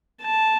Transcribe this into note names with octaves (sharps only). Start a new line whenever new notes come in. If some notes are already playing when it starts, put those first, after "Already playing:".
A5